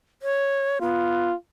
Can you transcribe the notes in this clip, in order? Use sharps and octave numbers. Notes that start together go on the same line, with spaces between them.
C#5
B3 F4